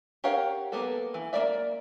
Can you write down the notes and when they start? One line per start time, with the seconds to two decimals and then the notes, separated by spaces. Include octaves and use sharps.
0.24 G4 A#4 C#5 F5 F#5
0.72 A#3 B3 A4
1.14 E3
1.33 A#3 F4 A#4 D5 E5